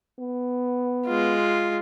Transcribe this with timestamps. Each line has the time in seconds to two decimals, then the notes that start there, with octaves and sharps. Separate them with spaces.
0.20 B3
1.06 G#3 F4